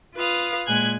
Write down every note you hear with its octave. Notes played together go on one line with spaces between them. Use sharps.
F4 B4 F5 D#6
A#2 G#3 G#5 F#6 G#6